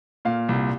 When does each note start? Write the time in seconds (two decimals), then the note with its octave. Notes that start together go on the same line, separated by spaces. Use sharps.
0.25 A#2 F5
0.49 C2